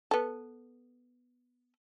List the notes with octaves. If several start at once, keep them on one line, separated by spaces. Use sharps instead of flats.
B3 A4